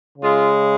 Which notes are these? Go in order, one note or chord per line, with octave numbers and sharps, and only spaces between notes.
C#3 G#3 F4